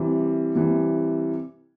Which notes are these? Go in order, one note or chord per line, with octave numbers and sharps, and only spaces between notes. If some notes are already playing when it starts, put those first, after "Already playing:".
Already playing: C3 E3 G3
C3 E3 G3